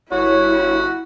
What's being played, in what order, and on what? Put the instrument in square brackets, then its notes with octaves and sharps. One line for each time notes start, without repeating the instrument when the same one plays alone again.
[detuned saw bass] G1 [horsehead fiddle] E4 [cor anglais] F#4 [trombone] C#5